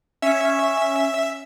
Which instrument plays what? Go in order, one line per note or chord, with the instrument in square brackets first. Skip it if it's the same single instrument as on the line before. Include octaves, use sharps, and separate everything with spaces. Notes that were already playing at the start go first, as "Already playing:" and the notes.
[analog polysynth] C#4 [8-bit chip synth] E5